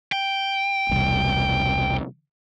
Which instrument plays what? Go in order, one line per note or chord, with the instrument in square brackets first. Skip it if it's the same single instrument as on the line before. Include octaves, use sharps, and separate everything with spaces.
[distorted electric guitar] G5
[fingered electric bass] E1 C2